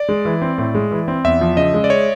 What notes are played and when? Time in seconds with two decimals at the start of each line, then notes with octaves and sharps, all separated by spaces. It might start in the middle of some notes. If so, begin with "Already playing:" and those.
Already playing: D5
0.09 G#3
0.25 E3
0.42 C4
0.58 A2
0.75 G#3
0.91 E3
1.08 C4
1.24 E2 E5
1.41 F3
1.57 C#3 D#5
1.74 G#3
1.84 D5
1.90 C#5